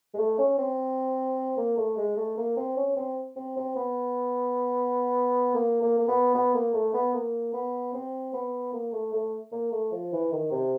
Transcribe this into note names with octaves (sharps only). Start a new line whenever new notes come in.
G#3
A3
C#4
C4
A#3
A3
G#3
A3
A#3
C4
C#4
C4
C4
C4
B3
A#3
A#3
A#3
B3
B3
A#3
A3
B3
A#3
B3
C4
B3
A#3
A3
A3
A#3
A3
F3
E3
D#3
C3